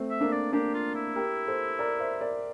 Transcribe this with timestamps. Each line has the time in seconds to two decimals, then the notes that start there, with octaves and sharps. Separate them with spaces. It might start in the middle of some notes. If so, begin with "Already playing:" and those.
Already playing: A3 C4
0.10 E5
0.21 A#3 D4
0.32 D5
0.52 A#3 D4 G4
0.73 F4
0.95 E4
1.16 G4 A#4
1.48 A4 C5
1.79 A#4 D5
2.00 C5 E5
2.21 A#4 D5